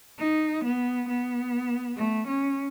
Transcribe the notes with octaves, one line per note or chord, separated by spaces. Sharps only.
D#4
B3
B3
A3
C#4